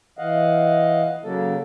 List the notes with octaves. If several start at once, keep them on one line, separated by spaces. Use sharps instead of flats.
E3 D#5 F5 F#5
C#3 F#3 A#3 A4